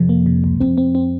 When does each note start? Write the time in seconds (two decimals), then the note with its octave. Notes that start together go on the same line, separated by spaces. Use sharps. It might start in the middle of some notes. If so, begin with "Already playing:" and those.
Already playing: F2 C3
0.09 A#3
0.26 C3
0.44 C#2
0.60 F2 C4
0.78 C4
0.95 C4